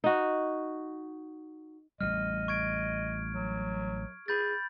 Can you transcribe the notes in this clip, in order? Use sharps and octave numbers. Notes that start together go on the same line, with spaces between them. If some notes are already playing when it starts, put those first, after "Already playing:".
D#4 F#4
A1 G3 D#5 F6
C#6 G#6 D7
F#3
G#4 B5 G6 A6